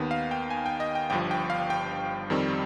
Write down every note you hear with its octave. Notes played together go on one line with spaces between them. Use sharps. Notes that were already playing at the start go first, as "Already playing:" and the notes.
Already playing: D#2 D#3 B3
F5
G5
G#5
G5
D#5
G5
G1 G2 F3 G5
G5
F5
G5
F2 D#3 G3 C4